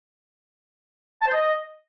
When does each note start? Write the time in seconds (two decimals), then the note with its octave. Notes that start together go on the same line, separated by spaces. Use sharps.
1.22 A5
1.27 C5
1.33 D#5